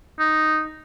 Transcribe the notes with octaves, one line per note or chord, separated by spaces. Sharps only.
D#4